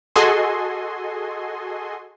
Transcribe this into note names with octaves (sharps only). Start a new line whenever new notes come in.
F#4 G#4 A4 D#5 G#5 C6